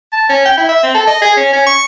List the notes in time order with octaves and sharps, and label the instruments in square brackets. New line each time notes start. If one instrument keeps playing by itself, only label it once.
[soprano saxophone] A5
C#4
G5
E4
E5
C4
A4
D#5
G#4
C#4
C#4
C#6